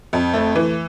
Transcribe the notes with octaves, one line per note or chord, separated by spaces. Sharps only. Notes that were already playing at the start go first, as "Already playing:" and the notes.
F2
A3
E3